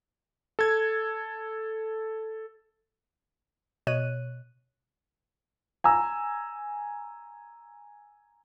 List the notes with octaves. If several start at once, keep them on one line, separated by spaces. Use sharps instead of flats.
A4 G#6
B2 C#5 D#5 F#6 D#7
G#5 A#5 E6